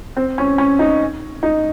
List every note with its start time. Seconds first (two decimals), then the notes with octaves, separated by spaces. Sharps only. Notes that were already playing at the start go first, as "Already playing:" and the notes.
0.17 C4
0.38 C#4
0.58 C#4
0.79 D#4
1.43 D#4